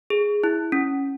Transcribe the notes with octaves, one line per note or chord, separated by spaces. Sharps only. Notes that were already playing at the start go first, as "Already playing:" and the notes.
G#4
E4
C#4